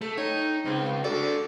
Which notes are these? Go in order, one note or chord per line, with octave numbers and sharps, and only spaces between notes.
A3 A5
D#4 C#5 G5
C#2 C4
D4 F#4 A4 D5